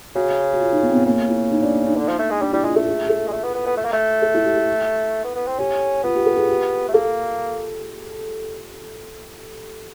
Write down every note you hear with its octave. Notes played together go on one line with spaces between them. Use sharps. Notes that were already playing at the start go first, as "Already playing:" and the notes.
C#3 F#4
F#4
F4
D#4
B3
C4
B3
C#3 A#3
E4
D#4
D4
D#4
D3
F3
A3
G#3
G3 D4
G3 E4
G#3 F4
A3 A4
G#4
G#4
A4
G#3
A3
B3
B3
B3
A3
A#3
A3
A4
E4
G4
A4
B3
B3
C4
C#4 G4
B3 F4
G4
A4
G#4
G4
A3
A#3 A4